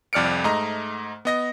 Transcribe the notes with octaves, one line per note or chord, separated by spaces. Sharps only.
C2 F2 D5 F6 C#7 D7
G#2 A3 D#5 A#5
B3 D#5 A#6